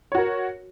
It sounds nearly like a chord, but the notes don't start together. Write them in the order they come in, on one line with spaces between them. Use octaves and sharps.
C#5 F#4 A#4